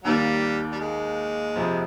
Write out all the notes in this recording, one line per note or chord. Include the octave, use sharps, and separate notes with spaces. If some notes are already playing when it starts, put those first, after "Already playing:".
D#2 D#3 G3 A#3
G3
G#3
F2 C3 F3